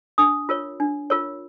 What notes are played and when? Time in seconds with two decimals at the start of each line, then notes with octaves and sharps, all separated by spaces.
0.18 D4 D#6
0.49 F4 A#4 C#5
0.80 D4
1.10 F4 A#4 C#5